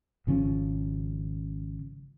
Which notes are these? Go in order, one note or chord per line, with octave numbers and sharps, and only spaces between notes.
G#1 C#3 F3 C#4